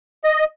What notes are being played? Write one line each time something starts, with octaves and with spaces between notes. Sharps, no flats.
D#5